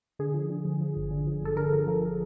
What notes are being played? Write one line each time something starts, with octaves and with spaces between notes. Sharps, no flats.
D3 G#4
F3
D3
F3
F3
G1
D3
F3
G1 A4
D3 A#4
F3
F3